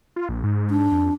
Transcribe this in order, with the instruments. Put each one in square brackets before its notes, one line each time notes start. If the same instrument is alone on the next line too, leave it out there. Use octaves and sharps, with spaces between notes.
[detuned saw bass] F4
A#1
G#2
[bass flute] D4
[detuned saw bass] F2